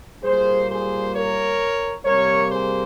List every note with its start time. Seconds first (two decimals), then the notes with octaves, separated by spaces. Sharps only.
0.23 A#2 G3 A#3 G#4 C5
0.69 G#4 C5
1.14 A#4 C#5
2.05 C3 G3 A#3 A#4 C#5
2.50 G#4 C5